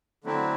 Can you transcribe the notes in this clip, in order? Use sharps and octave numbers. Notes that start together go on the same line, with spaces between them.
D3 F#3 A3 C4 E4